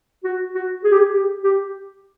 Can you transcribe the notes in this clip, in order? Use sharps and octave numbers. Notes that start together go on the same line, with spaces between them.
F#4
F#4
G#4
G4
G#4
G4
G4